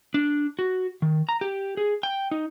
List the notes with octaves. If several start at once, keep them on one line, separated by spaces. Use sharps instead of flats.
D4
F#4
D#3
A#5
G4
G#4
G5
D#4